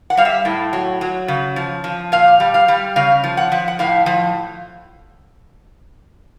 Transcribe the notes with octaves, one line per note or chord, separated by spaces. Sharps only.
F#5
G3 F5
E5
A2
F#3
F#3
C#3
F3
F3
A#2 F5
G3
F5
G3
C#3 F5
F3
F#5
F3
F#5
A2 F5
F3